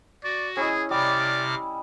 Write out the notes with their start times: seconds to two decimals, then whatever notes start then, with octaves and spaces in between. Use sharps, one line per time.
0.24 F#4 D5
0.57 C#4 E4 G#4 D#5
0.91 C3 G3 D5 D6 F6